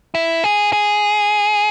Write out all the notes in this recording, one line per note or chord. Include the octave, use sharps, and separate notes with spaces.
E4
G#4
G#4